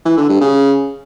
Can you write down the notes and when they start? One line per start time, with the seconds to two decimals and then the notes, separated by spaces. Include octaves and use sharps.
0.05 E3
0.17 D3
0.29 G2
0.41 C#3